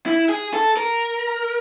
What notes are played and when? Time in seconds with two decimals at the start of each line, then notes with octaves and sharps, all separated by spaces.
0.06 E4
0.29 G#4
0.54 A4
0.77 A#4